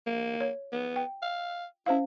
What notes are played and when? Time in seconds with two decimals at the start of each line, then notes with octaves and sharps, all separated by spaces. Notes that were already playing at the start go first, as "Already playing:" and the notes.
0.07 A#3
0.41 C#5
0.72 B3
0.96 G5
1.22 F5
1.86 C#4 E4 C5 F5